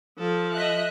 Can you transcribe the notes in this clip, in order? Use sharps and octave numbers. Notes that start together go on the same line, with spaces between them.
F3 A4
D#5 E5 F#6